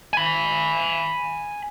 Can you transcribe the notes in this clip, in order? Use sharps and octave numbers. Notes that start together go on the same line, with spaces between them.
G#5 B5